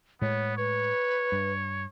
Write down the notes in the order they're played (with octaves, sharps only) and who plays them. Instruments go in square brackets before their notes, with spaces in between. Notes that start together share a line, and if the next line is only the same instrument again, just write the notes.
[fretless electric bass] A2 G#3 [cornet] B3 [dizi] C#5
[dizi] B4 [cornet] C#5
[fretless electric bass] G2